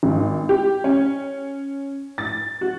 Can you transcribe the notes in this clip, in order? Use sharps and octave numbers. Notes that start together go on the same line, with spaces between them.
G#1
G4
C#4
A6
F#4